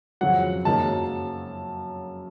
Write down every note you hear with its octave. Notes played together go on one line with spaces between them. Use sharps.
F2 C#3 F#3 F#5
F#2 C#3 F#3 A#3 D#4 A5